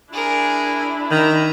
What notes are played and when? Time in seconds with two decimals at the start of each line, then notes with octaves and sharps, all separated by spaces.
0.13 D4 E4 G#4 A#4
1.11 D#3 E5 A#5